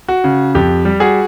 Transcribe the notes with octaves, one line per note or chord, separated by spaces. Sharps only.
F#4
C#3
F2 G4
G3
F#4 G#4